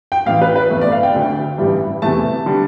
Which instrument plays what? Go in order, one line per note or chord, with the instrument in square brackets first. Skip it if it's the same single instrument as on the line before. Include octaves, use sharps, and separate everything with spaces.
[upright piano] G5
A1 A2 E3 F5
B4
B4
G1 F2 E3 A3
D5
F5
G5
D2 D3 A3
A1 G2 E3 G3
E2 C3 E3 A3 A5
D3 G3